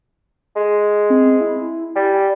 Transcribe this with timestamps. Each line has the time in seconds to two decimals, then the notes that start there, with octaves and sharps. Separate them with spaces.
0.56 G#3
1.10 C4
1.41 E4
1.96 G3 G#5